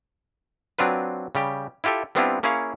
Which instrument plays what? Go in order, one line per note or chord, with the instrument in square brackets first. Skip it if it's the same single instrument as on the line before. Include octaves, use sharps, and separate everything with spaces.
[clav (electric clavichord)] F#3 C4 D4 F4 B4
C#3 G3 G4
E4 F4 G4 A4 E5
G3 B3 C4 D4 E4 F4
A#3 C#4 E4 G#4 C#5 F5